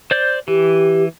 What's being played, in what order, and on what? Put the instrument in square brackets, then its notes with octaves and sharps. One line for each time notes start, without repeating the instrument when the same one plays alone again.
[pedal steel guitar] C5 D5 G6
[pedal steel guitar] E3 [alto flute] G4